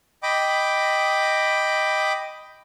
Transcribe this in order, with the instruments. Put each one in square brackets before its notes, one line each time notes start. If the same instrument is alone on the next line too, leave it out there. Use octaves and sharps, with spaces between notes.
[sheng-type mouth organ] D#5 G5 B5 D6